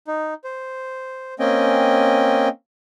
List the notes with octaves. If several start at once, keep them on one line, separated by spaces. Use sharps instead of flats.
D#4
C5
A#3 C4 C#4 D#5 G5 G#5